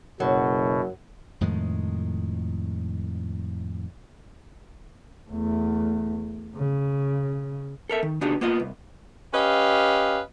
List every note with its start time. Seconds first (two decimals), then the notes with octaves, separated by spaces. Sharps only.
0.20 F#1 F#2 B2 F#3
1.41 F2 A2 D#3 G#3
5.29 E2 A3
6.55 C#3
7.89 A4 A#4 E5
8.03 D#3
8.21 C#3 B3 D4 D#4 F#4 G4
8.41 A#3 B3 F4 D#5
8.60 C2
9.34 C#4 G4 B4 D#5 F5